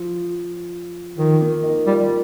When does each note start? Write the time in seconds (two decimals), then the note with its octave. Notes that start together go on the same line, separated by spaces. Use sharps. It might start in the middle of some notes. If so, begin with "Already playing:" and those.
Already playing: F3
1.18 D#3 F3
1.41 A#3
1.63 D#4
1.87 G3 F4